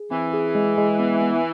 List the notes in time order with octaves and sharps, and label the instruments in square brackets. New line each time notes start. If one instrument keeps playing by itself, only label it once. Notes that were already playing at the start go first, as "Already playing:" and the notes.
Already playing: [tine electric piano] G#4
[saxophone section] E3 [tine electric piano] C4
[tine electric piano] G#4
G#3
G#3
B3
B3